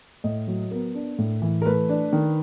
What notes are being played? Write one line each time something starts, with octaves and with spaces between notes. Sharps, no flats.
A2 D#5
F#3
B3 A#4
D4
A2
E3
A#4
A3 B4
D4
D#3